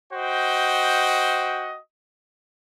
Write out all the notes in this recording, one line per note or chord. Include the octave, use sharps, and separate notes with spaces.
F#4 C5 D#5 G5